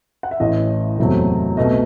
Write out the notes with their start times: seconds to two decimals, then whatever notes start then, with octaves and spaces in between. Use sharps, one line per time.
0.23 F#5
0.31 E5
0.40 A1 A2 E3 D#5
0.98 F#1 E2 C3 F#3 A3
1.57 C2 B2 A3 D#5